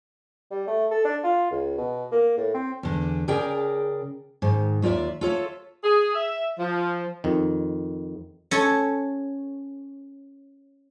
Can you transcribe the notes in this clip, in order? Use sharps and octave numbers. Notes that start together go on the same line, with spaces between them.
G3
A3
A4
D4
F4
C#2
B2
A#3
A2
C4
E2 D3
C#3 G#4 A#4 D5 G5 A#5
G#2 D#3
D#2 F4 C#5 D5 E5
F4 A4 C#5 E5
G#4
E5
F3
F2 D#3
C#4 A4 C#5